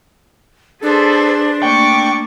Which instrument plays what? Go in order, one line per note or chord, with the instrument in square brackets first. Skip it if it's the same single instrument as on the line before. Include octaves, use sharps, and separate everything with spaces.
[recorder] D4 [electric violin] G#4 A4 [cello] B4 C5
[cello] A3 A#3 [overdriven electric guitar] G5 [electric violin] C#6 D6